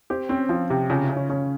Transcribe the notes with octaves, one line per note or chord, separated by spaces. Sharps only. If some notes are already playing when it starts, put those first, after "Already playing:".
C4 G4
C4 C#4
F3 F4
C3 G4
C#3 F4
C#4
C#3
C#4
C#3 C#4